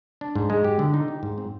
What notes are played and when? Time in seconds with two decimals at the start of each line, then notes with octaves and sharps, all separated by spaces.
0.21 D4
0.35 G#2
0.50 G#3
0.64 G4
0.79 D3
0.94 D#4
1.08 G4
1.23 G#2
1.38 C4